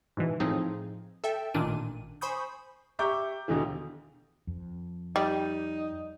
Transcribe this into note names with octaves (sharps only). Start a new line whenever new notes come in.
G#2 B2 E3
A2 F3 C4 D#4 G#4
A4 E5 G5
A1 A#2 D#3 D4 D#7
C5 G#5 B5 C#6 D#6 G6
G4 E5 A#5 C#6 D6 G6
D#2 B2 D3 E3
F2
G3 D#4